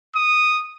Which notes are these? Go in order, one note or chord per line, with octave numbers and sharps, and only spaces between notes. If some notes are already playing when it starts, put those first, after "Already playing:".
D#6